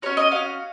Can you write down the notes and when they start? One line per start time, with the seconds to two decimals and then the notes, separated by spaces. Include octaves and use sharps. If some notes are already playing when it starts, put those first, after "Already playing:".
0.02 C#4 F#4 C#5
0.17 D#5
0.31 C#4 F#4 F5